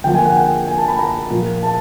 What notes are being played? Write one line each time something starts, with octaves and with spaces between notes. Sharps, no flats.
D3 F3 A#3 G5
G#5
F#5
G5
G#5
A5
B5
A#5
A#2 F3 A#3
A5